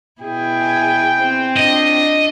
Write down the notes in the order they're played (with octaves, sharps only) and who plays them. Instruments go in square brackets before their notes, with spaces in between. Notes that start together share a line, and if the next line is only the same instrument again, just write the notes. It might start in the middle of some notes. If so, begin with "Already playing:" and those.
[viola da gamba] B2 E4 G#4 [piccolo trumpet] G5
[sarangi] G#5
C4
[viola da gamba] D4 F4 [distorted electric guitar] D#5